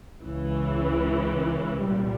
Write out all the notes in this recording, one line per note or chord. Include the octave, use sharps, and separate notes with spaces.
C#2 C#3 E3
C2 A#2 G3